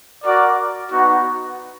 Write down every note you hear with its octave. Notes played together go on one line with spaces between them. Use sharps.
F#4 A#4 D5
B3 D#4 F#4